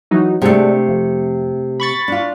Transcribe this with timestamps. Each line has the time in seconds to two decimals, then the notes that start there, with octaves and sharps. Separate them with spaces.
0.11 E3 F#3 D#4
0.42 C3 G#3 A3 D4
0.88 F2
1.80 B5 C#6 A6
2.08 D4 F4